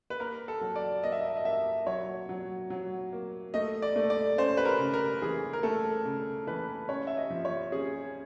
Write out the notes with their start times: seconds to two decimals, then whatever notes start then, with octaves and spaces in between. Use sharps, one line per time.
0.10 B4
0.20 A#3 A#4
0.48 A4
0.61 F#3
0.76 D5
1.03 A#3 D#5
1.12 E5
1.20 D#5
1.28 E5
1.37 D#5
1.45 A#3 E5
1.87 F#3 C#5
2.29 F#3
2.70 F#3
3.13 A#3
3.54 A3 D#5
3.82 D5
3.96 A3
4.10 D5
4.38 C#4 C5
4.57 B4
4.65 A#4
4.79 C#3
4.94 A#4
5.22 E3 G#4
5.53 A#4
5.63 A3 A4
6.05 C#3
6.47 E3 B4
6.89 C#4 C#5
7.07 E5
7.17 D#5
7.30 F3
7.45 C#5
7.72 C#4 G#4